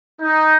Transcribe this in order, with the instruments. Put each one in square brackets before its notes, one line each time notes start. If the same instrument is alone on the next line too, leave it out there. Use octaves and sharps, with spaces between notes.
[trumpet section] D#4